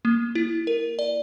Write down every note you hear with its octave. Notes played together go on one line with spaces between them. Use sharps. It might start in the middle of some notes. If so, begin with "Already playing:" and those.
A#3
E4
A#4
D5